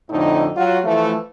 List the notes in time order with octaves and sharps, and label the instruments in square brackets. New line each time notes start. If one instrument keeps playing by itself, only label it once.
[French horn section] F2 A2 D3 D#4
F#3 F4 F#4
E3 F3 A3